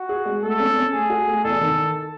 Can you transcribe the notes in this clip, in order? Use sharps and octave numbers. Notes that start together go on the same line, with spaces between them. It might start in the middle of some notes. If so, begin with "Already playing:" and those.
Already playing: F#4
G#4
G#3
A3 A4
C#4
C#4
A3 G#4
F#4
A3
E2 A4
D#3